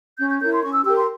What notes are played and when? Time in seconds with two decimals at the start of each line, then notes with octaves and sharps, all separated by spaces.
0.18 C#4 G6
0.29 G6
0.39 E4 A#4 C#5 G6
0.51 C6
0.62 C#4 C#6
0.73 E6
0.84 G4 A#4 E6
0.96 C6